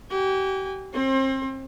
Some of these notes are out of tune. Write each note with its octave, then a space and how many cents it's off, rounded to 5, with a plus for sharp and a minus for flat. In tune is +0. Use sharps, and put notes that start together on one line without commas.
G4 -35 G#5 -40
C4 +30 C5 +35